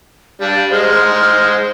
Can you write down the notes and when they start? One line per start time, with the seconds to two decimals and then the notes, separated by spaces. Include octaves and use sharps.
0.41 G3 D4 F5
0.72 G#3 G#4 C5 F6